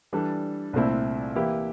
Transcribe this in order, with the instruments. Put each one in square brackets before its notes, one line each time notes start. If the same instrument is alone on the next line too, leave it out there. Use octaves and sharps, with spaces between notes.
[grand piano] E3 G3 D4 A4
C2 A#2 A3 C4 E4
E3 A#3 E4 G4